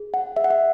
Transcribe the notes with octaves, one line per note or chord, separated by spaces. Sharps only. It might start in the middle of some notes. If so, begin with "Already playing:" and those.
Already playing: G#4
F#5
G#4 E5
F#5
E5